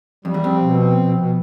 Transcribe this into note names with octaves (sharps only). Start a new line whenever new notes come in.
F2 G3
E2
F2 C4
B2
C4
B2
B2